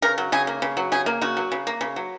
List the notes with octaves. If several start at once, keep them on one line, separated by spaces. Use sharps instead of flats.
C#3 A#4
F#3
C#3 G#4
A#3
C#3
F#3
C#3 G#4
A#3
C#3 F#4
F#3
C#3
A#3
C#3
F#3